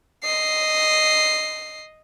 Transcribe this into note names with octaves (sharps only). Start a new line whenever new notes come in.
D#5 C7